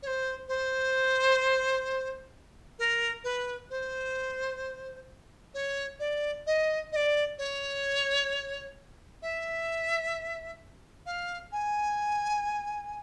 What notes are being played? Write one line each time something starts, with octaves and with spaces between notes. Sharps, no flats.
C#5
C5
C5
A#4
B4
C5
C#5
D5
D#5
D#5
D5
C#5
E5
F5
G#5